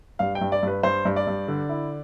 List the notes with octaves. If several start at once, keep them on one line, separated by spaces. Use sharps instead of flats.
G2 F5
G5
G2
D5
G2 B4
G2 C5
G2
D5
G2
D3
E4